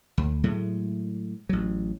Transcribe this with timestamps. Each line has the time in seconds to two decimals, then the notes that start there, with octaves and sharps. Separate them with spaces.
0.18 D2
0.44 A2 F#3 G#3 A3
1.49 A1 F#3